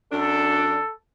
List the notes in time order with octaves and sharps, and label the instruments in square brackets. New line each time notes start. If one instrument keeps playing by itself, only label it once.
[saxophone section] F#2 D4 [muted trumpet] A4